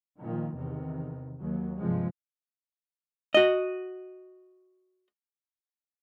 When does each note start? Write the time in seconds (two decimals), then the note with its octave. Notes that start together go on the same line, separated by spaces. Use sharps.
0.19 A#2 D#3 F3
0.55 E2 C3 D#3
1.39 D#2 F#3
1.79 G2 C3 F3 G#3
3.34 F#4 D#5